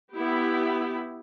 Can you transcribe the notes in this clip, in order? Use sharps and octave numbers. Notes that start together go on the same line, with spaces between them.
B3 E4 G4